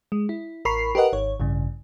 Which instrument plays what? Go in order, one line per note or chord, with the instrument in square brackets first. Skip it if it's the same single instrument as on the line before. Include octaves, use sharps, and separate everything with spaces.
[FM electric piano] G#3
E4
A1 A#4 B5 C#6 C7
G4 A#4 B4 D#5 F#5
G#1 C#5
A1 G2 C#3